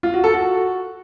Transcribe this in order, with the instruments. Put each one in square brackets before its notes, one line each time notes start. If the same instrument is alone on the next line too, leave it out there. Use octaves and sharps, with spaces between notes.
[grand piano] F4
F#4
A4
F#4